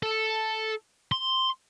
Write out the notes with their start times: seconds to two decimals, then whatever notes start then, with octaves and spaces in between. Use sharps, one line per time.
0.03 A4
1.12 C6